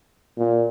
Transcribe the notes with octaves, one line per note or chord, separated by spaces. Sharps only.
A#2